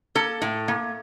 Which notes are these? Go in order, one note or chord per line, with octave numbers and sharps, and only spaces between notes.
A#3 A4
A2
A#3